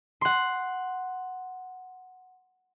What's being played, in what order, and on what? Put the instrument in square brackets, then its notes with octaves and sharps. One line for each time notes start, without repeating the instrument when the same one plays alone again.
[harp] F#5 C6